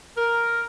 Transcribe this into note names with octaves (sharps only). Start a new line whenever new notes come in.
A#4